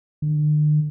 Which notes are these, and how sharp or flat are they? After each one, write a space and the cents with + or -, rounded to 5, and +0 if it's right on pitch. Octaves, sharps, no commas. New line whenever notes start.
D3 +45